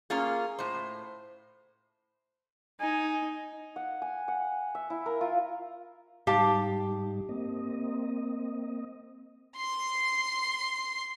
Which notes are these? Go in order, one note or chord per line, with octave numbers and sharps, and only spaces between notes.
A#3 C#4 F4 G#4
A2 C5
D#4 G#5
F#5
G#5
F#5
E5
E4
A#4
F4
G#2 G3 D#4 G4 F5 A5
A#3 C4 D#5
C6 C7